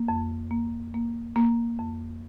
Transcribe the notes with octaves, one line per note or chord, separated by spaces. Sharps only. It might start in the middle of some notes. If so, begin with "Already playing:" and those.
Already playing: A#3
F2
A#3
A#3
A#3
F2